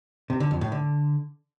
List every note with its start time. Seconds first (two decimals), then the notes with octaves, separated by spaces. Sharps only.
0.30 C3
0.40 D3
0.51 F2
0.61 A2
0.72 D3